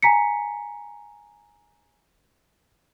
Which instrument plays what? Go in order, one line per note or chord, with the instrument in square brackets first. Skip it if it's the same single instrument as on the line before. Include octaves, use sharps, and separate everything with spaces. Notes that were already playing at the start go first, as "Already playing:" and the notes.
[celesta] G#5 A#5 B6 C#7